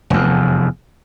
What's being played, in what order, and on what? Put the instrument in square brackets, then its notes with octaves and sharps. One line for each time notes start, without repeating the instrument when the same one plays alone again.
[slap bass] F1 E2